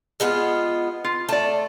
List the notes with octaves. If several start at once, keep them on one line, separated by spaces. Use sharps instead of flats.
G#3 B3 F4
F4
A3 D5 A5